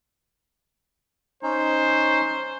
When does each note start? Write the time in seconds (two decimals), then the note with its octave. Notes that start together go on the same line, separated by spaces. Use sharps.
1.43 C#4 D#4 C5